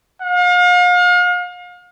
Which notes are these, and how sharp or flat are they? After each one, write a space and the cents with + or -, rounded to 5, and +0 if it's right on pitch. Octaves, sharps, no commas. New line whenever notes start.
F5 +40